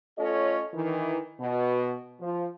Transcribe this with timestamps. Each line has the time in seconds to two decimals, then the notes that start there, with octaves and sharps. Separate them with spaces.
0.17 A3 C#4 F4 A4 C#5 D#5
0.74 D#3 E3
1.39 B2
2.20 F3